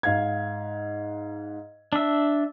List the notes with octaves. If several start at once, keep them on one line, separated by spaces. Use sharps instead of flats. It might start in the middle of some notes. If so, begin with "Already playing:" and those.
G#2 F5 G#6
D4 E5